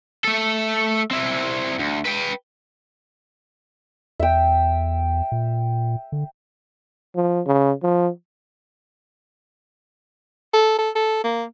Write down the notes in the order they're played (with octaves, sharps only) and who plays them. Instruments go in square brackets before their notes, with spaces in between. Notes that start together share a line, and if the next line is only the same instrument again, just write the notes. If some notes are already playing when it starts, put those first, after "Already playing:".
[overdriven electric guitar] A3 A4
C4 E4
D2
B4 G5
[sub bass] E2 [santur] E5 G5
[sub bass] A#2
D3
[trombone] F3
C#3
F3
[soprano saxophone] A4
A4
A4
A#3